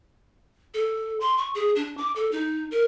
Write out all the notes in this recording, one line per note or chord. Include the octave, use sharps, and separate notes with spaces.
A4
C6
C#6
G#4
D4
D6
A4
D#4
A#4